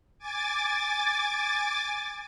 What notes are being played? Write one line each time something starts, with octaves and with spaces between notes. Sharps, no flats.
G#5 D6 A6